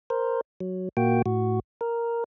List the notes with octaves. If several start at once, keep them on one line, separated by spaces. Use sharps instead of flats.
A#4 C5
F#3
A#2 A#3 F#4 G5
A2 F#4
A#4